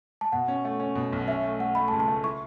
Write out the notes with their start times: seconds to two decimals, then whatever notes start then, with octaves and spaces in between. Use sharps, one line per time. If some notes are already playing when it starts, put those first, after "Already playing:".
0.21 A5
0.32 B2 F#5
0.48 C#4
0.65 A3
0.80 C#4
0.95 B2
1.13 B1
1.27 C#4 E5
1.43 A3
1.59 A3 F#5
1.75 A3 B5
1.88 A5
1.92 C#2
2.00 A5
2.08 A3
2.23 E4 C#6